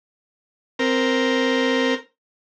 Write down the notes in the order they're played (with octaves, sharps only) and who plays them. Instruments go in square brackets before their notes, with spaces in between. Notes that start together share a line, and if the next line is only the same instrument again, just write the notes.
[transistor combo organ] C4 A#4